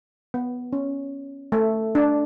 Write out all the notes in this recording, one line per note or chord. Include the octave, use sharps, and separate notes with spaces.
B3
C#4
A3
D4